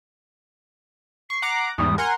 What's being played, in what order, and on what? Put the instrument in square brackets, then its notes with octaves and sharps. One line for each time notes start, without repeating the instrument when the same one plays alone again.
[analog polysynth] C#6 [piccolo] C7
[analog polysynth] F#5 A#5 D6
[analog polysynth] E2 G#2 G3 [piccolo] D#6
[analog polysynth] A#4 F#5 C6 [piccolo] G#5